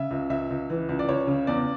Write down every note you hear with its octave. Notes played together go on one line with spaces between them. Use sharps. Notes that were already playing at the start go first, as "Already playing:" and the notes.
Already playing: C#3 E5
C#2
C#2 E5
C#2
E3
C#2
D5
C#2 C#5
C#3
E2 D5